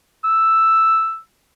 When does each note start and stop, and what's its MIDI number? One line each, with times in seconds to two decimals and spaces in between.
0.24 1.18 88